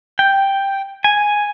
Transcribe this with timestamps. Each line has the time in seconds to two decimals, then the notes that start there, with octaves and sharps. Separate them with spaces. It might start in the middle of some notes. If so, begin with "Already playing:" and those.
0.19 G5
1.04 G#5